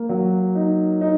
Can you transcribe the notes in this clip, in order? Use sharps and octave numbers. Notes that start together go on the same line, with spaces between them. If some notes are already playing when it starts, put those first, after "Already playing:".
Already playing: A#3
F#3
D#4
D#4